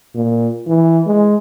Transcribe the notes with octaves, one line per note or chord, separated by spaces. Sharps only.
A#2
E3
G#3